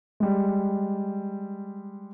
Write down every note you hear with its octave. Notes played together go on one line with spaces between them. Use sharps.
G3 G#3